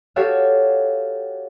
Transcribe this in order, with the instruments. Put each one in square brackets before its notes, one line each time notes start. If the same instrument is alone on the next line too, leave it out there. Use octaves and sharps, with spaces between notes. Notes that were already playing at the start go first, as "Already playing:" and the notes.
[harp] F#4 G4 A4 C#5 E5 F5